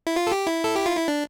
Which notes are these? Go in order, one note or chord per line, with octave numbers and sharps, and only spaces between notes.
E4
F4
A4
G4
E4
A4
G4
F4
E4
D4